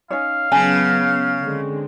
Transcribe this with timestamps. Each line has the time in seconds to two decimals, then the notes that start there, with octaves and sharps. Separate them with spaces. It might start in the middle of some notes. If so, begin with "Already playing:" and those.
0.11 C#4 D#4 C#5 F5
0.52 C#3 F#3 B3 G#5 A5
1.43 D3 G#3 C4